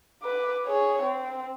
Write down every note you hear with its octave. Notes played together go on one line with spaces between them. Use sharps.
B4 D6
G#4 C#5
C4